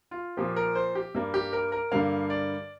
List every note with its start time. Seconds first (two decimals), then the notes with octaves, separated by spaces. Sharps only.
0.11 F4
0.37 A#2 F3 A#3 G4
0.56 A#4
0.75 C5
0.95 G4
1.15 G2 G3 A#3
1.34 G4
1.53 A#4
1.72 A#4
1.92 G2 D3 G3 A#3 F5
2.30 D5